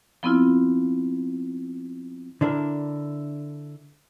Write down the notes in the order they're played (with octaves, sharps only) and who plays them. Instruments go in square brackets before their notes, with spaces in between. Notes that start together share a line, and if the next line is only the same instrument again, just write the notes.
[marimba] F3 B3 C4 E4 F4
[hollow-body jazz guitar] D3 D4 E4 A#4